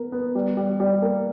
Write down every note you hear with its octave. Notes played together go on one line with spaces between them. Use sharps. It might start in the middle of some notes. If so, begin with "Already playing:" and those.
Already playing: B3 A#4
B3
G3
G3
G3
A#3